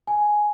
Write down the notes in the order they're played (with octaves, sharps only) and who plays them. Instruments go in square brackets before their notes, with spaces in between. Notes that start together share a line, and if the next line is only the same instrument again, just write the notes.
[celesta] G#5